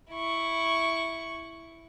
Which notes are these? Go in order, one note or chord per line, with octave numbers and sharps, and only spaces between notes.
E4 C#6